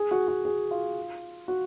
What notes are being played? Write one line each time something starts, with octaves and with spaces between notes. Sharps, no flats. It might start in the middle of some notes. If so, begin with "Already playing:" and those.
Already playing: G#4
F#4
F#4
G#4
F4
F#4